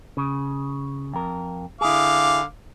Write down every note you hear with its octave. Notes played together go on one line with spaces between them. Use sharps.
C#3
F2 A#4
D3 E4 G#4 F5 D6